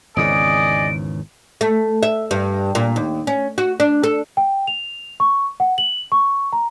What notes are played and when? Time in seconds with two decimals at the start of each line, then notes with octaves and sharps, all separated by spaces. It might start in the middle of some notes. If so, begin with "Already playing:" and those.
0.16 G#1 E2 C#3 G#4 D5 D#5 D7
1.61 A3
2.03 E5
2.31 G2
2.75 A#2
2.96 D#2
3.27 C#4
3.58 F#4
3.80 D4
4.03 A4
4.37 G5
4.67 F7
5.20 C#6
5.60 F#5
5.78 F#7
6.12 C#6
6.53 A#5